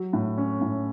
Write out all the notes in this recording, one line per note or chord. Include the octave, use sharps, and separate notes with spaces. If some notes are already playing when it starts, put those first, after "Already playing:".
Already playing: F#3
A2
C#4
A2